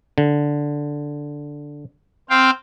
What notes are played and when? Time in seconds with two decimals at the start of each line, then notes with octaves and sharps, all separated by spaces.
0.18 D3
2.30 C4 F5 G5